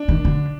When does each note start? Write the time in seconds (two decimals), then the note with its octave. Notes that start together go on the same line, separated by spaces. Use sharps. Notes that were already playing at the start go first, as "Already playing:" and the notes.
Already playing: D4
0.08 D#3
0.25 D3